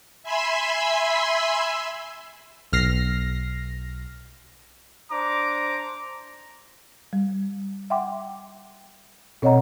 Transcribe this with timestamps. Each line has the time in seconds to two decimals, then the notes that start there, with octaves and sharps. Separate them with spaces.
0.23 E5 G#5 B5 C6 E6
2.72 B1 F6 A#6 C7
5.11 D4 C5 A#5 D6
7.13 G3
7.90 E5 F#5 G5 C6 D6
9.42 B2 C4 C#5 D#5 F#5 A#5